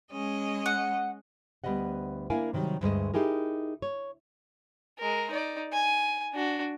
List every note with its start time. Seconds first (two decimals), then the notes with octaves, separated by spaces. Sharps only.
0.11 G#3 C#4 D#5
0.66 F#5
1.64 D2 G3 B3 D5 D#5 F#5
2.30 A#3 D4 E4 A#4 F5 G#5
2.53 C3 D#3 F#3 G3
2.81 D2 G2 G#3 A3 D#5
3.14 D#4 E4 G4 G#4 A#4
3.82 C#5
4.99 G#3 A#4
5.30 D#4 D5
5.73 G#5
6.33 D4 F#4